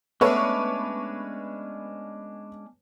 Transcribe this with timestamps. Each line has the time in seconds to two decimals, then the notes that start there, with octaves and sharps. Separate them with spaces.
0.21 G#3 A3 B3 C#4 D4 B4 C#5 C#6